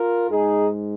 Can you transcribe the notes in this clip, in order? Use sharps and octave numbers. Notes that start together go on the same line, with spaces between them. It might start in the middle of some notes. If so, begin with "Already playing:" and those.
Already playing: F4 A#4
G#2 G#3 D#4 G#4